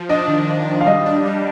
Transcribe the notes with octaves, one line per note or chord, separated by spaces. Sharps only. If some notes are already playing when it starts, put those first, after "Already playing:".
Already playing: F3
D4 D#5
D#3
D#3
D#3
F5
G3 D#5
D4
G3